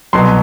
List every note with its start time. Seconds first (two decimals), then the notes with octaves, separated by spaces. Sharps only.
0.13 C2 B2 F#3 C6